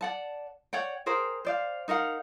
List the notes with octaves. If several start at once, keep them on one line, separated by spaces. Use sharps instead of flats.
D5 F#5 A5
C#5 D5 F#5 G5
G#4 A#4 C5 G5
C5 D5 F5
D#4 A#4 F5 F#5